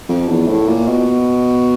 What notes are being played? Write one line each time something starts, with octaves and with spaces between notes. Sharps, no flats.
F2
E2
A2
A#2
B2